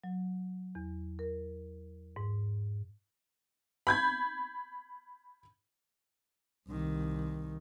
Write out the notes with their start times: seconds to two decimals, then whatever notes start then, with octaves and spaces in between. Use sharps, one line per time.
0.04 F#3
0.75 E2
1.19 A#4
2.16 G#2
3.87 B5 G6 G#6
6.68 C2 D#3